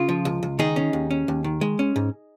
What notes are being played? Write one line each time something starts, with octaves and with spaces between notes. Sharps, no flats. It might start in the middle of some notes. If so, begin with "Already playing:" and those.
Already playing: C#3 F4
F3
C#2
C#2
D#3 D#4 G#4
C#4
D#2
C#4
D#2
D#3
G#3
C#4
G#2